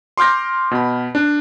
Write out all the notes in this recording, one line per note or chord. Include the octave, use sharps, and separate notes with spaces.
C6 D6 F6 G6 A#6
B2 B5
D4